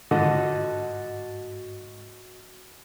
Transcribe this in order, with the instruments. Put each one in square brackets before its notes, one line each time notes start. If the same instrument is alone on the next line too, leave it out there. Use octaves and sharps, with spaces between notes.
[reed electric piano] G#2 [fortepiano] D3 [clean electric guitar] F#4 A4 D#5